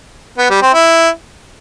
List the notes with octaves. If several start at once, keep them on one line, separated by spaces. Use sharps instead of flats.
B3
G3
C4
E4